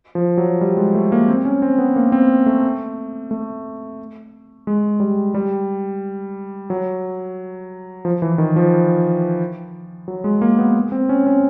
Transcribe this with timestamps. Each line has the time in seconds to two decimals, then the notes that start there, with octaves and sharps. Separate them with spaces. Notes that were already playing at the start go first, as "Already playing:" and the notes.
0.15 F3
0.38 F#3
0.61 G3
0.77 G#3
0.95 A3
1.12 A#3
1.28 C4
1.45 C#4
1.62 C4
1.78 B3
1.96 A#3
2.12 C4
2.46 A3
3.31 A3
4.67 G#3
5.00 G3
5.34 G3
6.70 F#3
8.05 F3
8.22 E3
8.38 D#3
8.56 F3
10.08 F#3
10.24 G#3
10.42 A#3
10.58 B3
10.92 C4
11.09 C#4
11.27 C#4